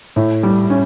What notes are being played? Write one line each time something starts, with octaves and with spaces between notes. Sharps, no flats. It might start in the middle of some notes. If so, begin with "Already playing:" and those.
A2
G3
C#4